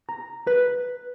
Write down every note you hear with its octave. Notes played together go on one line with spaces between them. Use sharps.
A#5
B4